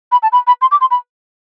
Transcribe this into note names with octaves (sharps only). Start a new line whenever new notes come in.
B5
A5
B5
B5
C6
D6
C6
B5